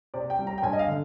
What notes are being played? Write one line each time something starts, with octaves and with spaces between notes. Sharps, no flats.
C3 D5
G5
G3
A#5
G5
G2 G#5
D#5
F5
D3